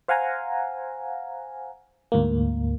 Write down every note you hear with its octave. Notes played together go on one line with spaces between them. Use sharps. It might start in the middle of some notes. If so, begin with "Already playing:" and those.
C5 F5 F#5 G#5 A#5
D2 G#2 A#3